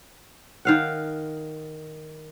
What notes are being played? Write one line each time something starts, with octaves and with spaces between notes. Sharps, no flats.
D#3 F5 F#5